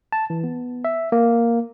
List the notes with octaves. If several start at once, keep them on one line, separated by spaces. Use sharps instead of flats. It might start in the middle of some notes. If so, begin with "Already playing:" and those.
A5
E3
B3
E5
A#3